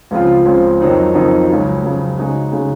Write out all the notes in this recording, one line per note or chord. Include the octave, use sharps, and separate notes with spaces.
C#2 C#3 F3 C4 F4
C#2 C#3 F3 C4 F4
F2 D#3 F#3 C4 D#4
F2 D#3 F#3 C4 D#4
C#2 C#3 F#3
C#2 C#3 F#3
C#3 G#3 D#4 F#4
C#3 G#3 D#4 F#4